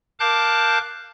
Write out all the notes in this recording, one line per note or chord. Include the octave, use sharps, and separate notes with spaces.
A#4 F5 A5 D6 F#6 G6